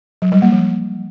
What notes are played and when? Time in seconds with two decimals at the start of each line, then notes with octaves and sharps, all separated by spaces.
0.22 F#3
0.32 G3
0.42 A#3
0.52 F3